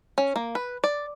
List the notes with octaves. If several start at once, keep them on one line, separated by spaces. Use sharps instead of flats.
C#4
A#3
B4
D5